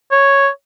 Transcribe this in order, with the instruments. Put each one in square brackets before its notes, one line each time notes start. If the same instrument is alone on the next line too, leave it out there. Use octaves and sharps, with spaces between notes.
[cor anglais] C#5